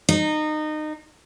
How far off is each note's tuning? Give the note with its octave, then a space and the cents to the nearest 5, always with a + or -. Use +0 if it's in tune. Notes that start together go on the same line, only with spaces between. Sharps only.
D#4 -25